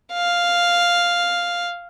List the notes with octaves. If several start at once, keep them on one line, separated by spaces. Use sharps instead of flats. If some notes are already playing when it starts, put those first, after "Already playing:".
F5